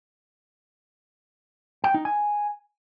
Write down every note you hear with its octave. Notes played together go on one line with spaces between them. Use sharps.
G5
D#4
G#5